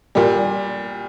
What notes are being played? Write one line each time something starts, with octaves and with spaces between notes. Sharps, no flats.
A#2 G3